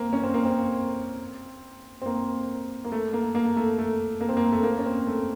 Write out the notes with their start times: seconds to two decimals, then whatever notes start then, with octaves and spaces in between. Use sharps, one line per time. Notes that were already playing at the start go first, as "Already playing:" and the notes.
Already playing: A#3 C4
0.13 C#4
0.24 C4
0.34 A#3
0.45 C4
2.02 C4
2.06 A#3
2.85 A#3
2.92 A3
3.13 A#3
3.35 A#3
3.56 A3
3.78 A3
4.21 A#3
4.29 C4
4.37 A#3
4.52 A3
4.64 A#3
4.79 C#4
4.86 C4
5.07 A3